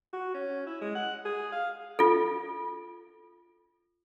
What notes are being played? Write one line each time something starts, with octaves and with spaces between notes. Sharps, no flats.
F#4
C#4
E4
G#3
F#5
G#4
F5
F4 A4